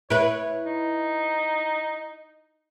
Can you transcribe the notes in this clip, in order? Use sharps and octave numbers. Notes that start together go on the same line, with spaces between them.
E4 B4 C#5
D#4